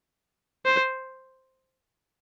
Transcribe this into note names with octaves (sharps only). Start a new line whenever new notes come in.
C5